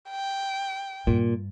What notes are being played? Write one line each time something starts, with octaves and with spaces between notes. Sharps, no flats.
G5
G2 A#2